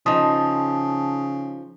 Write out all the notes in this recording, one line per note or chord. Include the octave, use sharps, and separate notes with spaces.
C#3 F3 D#4 A5 D#6